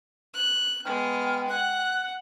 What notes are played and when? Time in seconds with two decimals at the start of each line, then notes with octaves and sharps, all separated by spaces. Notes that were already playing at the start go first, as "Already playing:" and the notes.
0.34 F#6
0.85 G#3 B3 G5 F6
1.50 F#5 F#6